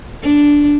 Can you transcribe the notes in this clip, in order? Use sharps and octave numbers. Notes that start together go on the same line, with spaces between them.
D4